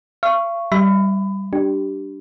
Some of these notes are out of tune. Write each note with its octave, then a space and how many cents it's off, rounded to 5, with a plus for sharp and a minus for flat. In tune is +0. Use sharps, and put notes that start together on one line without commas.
F5 -40 C#6 +0
G3 -10 E5 +0 B5 +25
D4 +0 G4 -15